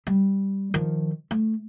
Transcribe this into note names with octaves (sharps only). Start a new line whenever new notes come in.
G3
D#3 F3
A3